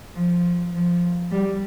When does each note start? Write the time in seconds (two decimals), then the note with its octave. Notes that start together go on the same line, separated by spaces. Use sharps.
0.15 F3
0.74 F3
1.31 G3